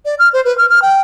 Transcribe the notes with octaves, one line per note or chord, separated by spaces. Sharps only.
D5
F6
C5
B4
F6
F6
G5